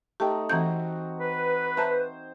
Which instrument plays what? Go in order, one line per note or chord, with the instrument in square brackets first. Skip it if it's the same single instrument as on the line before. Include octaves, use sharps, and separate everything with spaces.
[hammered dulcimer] A3 D#4 [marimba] G4 G5
[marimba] E3 G6 [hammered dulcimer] C4 F#4 A#5
[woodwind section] B4
[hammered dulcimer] C5 [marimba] E5 A5 A#5